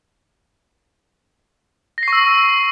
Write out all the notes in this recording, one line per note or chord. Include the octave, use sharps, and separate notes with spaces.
C#6 E6 A#6 C7